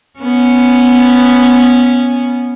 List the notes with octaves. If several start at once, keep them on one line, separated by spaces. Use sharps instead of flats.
B3 C#4